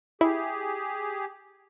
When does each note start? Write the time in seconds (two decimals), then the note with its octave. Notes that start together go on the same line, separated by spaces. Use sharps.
0.21 E4 G4 G#4